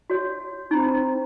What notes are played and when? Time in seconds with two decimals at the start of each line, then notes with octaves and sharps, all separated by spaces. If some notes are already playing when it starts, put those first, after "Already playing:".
0.10 F#4 C#5
0.71 C4 D#4 A#5 B5